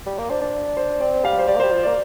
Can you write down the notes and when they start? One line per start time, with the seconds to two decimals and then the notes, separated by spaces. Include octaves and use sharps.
0.06 G3
0.19 A#3
0.30 D4 C5
0.41 D4
0.77 C5
1.01 C4 D5
1.24 G3 F5
1.39 C5
1.48 G3 D5
1.56 A#3
1.60 C5
1.63 G3
1.71 F3
1.83 D5
1.87 A#3